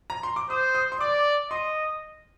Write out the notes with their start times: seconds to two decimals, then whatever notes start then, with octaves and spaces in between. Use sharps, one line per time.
0.10 A#5
0.23 C6
0.36 D6
0.50 C5 D#6
0.75 D#6
0.92 C6
1.00 D5 D6
1.51 D#5 C6